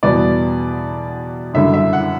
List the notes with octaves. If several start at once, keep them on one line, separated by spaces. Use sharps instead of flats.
E2 B2 G3 B3 D5
F#2 D3 G3 E5
E5
F#5